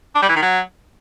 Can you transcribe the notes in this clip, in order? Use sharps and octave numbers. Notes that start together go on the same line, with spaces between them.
D4
G3
E3
D#3
F#3